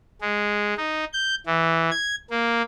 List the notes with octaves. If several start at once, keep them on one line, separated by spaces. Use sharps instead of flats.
G#3
D#4
G6
E3
G#6
A#3